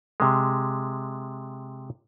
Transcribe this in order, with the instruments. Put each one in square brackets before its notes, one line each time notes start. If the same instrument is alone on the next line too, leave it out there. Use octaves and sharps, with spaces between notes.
[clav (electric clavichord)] C3 G#3